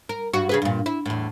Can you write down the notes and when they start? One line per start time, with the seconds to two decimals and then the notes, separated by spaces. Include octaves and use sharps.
0.09 A#4
0.33 G2 F#4
0.49 C#3 G#4 B4
0.62 G2 A#2
0.86 E4
1.06 E2 A2